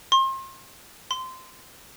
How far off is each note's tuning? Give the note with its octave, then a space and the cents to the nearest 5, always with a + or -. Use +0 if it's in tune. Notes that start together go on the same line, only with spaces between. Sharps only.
C6 +35
C6 -15